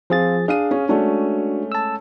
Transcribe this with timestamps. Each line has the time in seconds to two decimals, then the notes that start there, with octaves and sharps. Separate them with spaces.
0.10 F3 C4 F4 G#4 A6
0.48 D4 G#4 F5 D#7
0.71 C#4
0.89 G#3 A3 C#4 D4 F#4
1.72 A5 E6